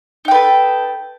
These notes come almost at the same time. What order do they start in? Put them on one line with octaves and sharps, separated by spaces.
D#4 G5 B4 A4